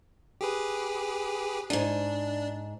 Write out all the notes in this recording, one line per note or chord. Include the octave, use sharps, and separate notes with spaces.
G4 G#4 B4
D2 G#2 D4